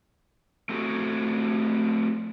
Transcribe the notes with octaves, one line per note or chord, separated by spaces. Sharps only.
A3 C4 F#4 G#4